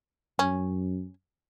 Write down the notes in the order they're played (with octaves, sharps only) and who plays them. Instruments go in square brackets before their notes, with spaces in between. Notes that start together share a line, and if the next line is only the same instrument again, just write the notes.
[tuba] F#2 [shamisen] C#4